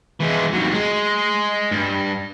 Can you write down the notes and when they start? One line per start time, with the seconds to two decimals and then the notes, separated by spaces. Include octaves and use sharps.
0.20 E3 G#3
0.53 D#2 F#3
0.74 G#3
1.72 G2